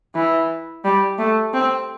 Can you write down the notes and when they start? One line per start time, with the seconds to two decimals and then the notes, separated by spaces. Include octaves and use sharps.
0.15 E3
0.85 G3
1.18 A3
1.53 C4